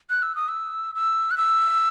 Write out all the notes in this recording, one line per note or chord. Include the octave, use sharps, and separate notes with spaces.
F#6
E6
D#6
E6
E6
F#6
E6